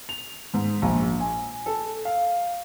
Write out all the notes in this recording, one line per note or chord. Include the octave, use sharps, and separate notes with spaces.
F7
G#2
A#1
G#5
A4
F5